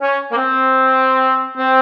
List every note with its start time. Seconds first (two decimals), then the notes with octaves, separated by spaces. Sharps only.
0.01 C#4
0.31 A#3
0.36 C4
1.57 C4